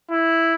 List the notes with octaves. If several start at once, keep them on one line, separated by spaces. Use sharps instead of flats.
E4